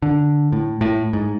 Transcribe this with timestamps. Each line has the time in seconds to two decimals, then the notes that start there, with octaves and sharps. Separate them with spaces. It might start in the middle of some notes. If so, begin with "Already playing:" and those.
0.02 D3
0.52 A2
0.81 A2
1.13 G#2